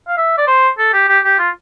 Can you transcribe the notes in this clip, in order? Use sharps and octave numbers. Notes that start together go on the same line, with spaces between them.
F5
E5
D5
C5
A4
G4
G4
G4
F4